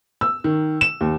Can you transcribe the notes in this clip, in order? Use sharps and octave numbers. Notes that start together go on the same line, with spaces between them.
E6
D#3
E7
D#2